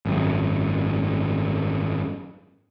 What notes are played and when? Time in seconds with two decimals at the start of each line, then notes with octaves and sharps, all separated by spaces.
0.06 G#1 F#2